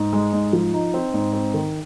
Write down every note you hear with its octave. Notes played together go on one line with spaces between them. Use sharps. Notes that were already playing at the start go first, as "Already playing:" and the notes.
Already playing: G#2
G#3
G#2
F3
D#4
C4
G#2
C4
D#3